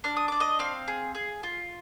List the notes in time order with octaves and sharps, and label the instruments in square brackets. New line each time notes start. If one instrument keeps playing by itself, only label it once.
[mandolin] D4 F6
D#6
D4 D6
D#5 D#6
C4 F5 F6
G#4
G#4
F4